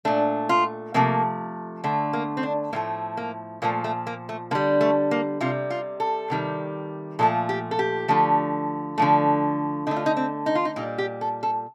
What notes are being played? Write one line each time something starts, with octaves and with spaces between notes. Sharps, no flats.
A#2 A3 D4
F4
C3 F3 A3 A#3
D3 A3
A#3
C4
D4
A2 F3 A3 A#3
A#3
A#2 F3 A3 A#3
A3
A#3
A3
D3 G3 A#3
A3
A#3
C3 G3 F4
F4
A4
C3 D#3 G3
A#2 F3 A3 A4
G4
A4
G4
D3 F3 A3
D3 F3 A3
D3 A3 D#4
F4
D#4
C4
D#4
F4
D#4
A#2 G3 D#4
G4
A4
A4